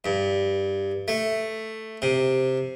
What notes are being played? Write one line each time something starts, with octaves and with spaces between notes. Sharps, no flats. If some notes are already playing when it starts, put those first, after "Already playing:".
G2
A3
C3